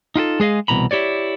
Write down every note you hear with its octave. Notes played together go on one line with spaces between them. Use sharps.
D#4 F4 G4 A4
G#3 G#4 D#5 F5
C2 B2 E3 A#5 B5
E4 G4 C#5 D5